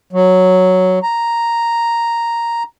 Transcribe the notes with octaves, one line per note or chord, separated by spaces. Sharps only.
F#3
A#5